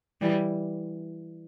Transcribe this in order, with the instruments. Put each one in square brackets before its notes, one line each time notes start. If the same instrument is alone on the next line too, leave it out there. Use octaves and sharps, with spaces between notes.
[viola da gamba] E3 G3